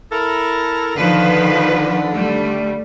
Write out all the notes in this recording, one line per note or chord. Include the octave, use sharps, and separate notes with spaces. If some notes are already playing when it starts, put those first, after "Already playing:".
E4 A4 A#4
D3 D#3 F3 B4
G3 A3